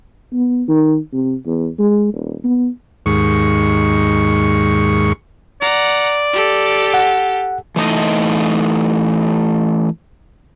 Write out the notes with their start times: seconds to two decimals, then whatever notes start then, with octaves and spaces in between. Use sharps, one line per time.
0.33 B3
0.68 D#3
1.13 C3
1.46 E2
1.79 G#3
2.13 D#1
2.44 B3
3.06 D#2 G#2 C#6
5.61 D5 F#5 A#5
6.33 G4 A4
6.94 F#5
7.76 E3 A3 D#4 D#5